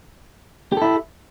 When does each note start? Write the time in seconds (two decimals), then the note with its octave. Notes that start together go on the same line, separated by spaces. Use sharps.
0.72 G4
0.77 A4
0.82 E4